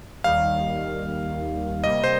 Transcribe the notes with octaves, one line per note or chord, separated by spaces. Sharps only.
D#2 D#3 G3 F5
C3 G3 A#3 D#5
C5